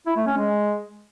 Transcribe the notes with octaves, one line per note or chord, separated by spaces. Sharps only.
E4
A3
C#4
G#3